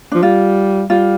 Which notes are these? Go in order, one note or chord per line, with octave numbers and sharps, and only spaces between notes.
F3 D4
G3 F4
G3 F4